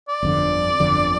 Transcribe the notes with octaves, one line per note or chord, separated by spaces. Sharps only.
D5
G1 F2 D3
G1 F2 D3